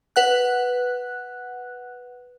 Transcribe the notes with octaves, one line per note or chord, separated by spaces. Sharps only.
B4 F#5 F#6